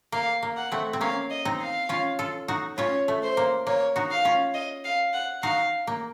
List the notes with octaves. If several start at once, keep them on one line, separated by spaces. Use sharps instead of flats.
A#3 F5
A#3
F#5
A3 C4
C4
A#3 C#4 F5
D#5
C4 D#4
F5
C#4 F4
F4 A4
D#4 F#4
C#4 F4 C#5
A3
C5
A#3
A#3 C#5
D#4 F#4
F5
C#4 F4
D#5
F5
F#5
D#4 F#4 F5
A#3